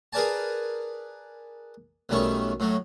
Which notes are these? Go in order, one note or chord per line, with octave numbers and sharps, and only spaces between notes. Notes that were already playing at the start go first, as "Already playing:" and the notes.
G#4 A#4 B4 D5 G#5 A5
B1 D#3 G3 A3 C#4 C#6
A2 F#3 A3